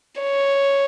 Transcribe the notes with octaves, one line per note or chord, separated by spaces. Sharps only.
C#5